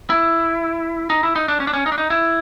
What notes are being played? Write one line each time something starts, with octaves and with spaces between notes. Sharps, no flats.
E4
D#4
E4
D#4
D4
C#4
D4
C#4
D#4
D4
D#4
E4